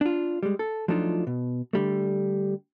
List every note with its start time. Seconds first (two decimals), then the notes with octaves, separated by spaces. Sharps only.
0.01 D4 F4
0.43 G3 G#3
0.59 A4
0.88 F3 F#3 A3 D4 D#4 F4
1.27 B2
1.73 D3 G3 A3